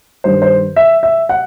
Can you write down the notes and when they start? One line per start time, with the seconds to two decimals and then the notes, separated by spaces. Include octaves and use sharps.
0.24 G2 D#3 C5
0.42 C5
0.76 E5
1.03 E5
1.29 F#5